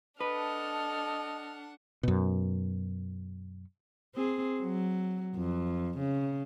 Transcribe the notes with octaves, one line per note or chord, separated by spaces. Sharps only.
D4 A4 B4 D#5 F#5 F6
F#2 B2
C4 G#4
F#3
F2
C#3